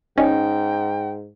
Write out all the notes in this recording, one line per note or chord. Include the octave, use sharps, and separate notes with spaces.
G#2 C#4 D#4 G5